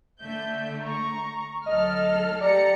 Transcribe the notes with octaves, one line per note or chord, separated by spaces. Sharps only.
D3 A3 E5 G6
A#5 C#6
D2 F#3 A4 D#5 F6
G4 D5 A#5 C#7